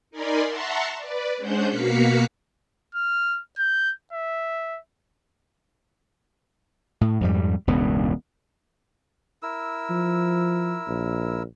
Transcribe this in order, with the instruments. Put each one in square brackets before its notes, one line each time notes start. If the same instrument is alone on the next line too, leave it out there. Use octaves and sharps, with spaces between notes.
[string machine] D#4 A#4 D5 G#5 B5 C6
E5 F#5 A5 A#5 C6 C#6
B4 D5
G#3 C#4 D4 C5 F#5 G6
B2 A#3 F#4 F5 B6 C#7
[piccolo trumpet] F6
G6
E5
[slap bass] A2
F2 G#2 G3
E1 C#2 G2 B3
[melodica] E4 A#4 E6
[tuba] F3
A#1